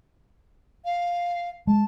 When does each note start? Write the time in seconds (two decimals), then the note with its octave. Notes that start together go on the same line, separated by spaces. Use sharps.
0.85 F5
1.67 G#3 A5